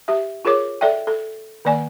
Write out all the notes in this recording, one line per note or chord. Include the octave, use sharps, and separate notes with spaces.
G4 E5
F4 G#4 A#4 C#5 D6
A4 D5 E5 G5
A4
D#3 A#3 D5 G#5